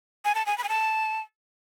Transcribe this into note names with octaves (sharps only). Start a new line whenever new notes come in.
G#5
A5
G#5
B5
G#5
A5